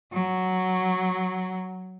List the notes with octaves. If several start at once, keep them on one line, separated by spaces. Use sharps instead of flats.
F#3